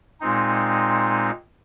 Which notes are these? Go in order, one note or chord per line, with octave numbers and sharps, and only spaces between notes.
A#2 G#3 C4 D#4